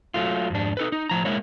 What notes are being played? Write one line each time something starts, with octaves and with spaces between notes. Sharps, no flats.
F#3 A3 F4
F2 G#2 D4
D#4 A4 B4
D#4
A2 F3 A#5
G#3 A#3 E4 C#5